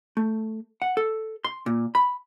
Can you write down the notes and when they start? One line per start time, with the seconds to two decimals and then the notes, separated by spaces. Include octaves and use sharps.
0.17 A3
0.82 F#5
0.97 A4
1.44 C6
1.66 A#2
1.95 B5